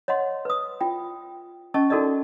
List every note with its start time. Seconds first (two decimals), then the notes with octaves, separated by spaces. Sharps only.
0.08 C#5 D#5 F#5 C6
0.45 B4 D#6
0.81 F4 G5
1.74 C#4 D#5 A5 C#6
1.90 D#4 F#4 A4 A#4 D5 D#5